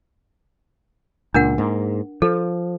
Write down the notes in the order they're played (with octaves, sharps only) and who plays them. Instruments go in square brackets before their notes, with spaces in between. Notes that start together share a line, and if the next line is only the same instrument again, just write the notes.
[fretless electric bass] C#2 A#2 [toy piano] D4 A#4 F#5
[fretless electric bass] G#2 A#3
[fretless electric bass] F3 [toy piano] A4